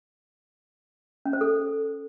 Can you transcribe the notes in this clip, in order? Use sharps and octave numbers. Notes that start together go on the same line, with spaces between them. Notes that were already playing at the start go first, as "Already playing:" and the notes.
C#4
C5
A4